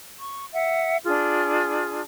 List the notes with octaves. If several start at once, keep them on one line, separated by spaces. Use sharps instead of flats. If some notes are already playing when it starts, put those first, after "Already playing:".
C#6
E5 F#5
D4 F4 G#4